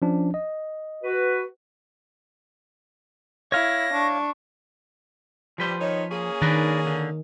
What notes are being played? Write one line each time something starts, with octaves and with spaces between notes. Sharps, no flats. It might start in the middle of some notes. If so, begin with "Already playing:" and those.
F3 C#4 D4
D#5
F#4 B4
E4 C#5 F5 A#6
D4 C#6
F3 G3 B4 C5
D#3 D#4 C#5
A#3 C#4 G#4
D#3 D4 A#4 B4
D3